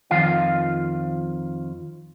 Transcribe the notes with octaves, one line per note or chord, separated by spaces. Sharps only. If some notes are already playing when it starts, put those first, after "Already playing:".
F2 D#3 F4 F5